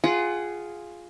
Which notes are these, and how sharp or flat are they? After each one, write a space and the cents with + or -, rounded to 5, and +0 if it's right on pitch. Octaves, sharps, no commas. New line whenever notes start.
F4 +0 G#4 +0 F#5 +25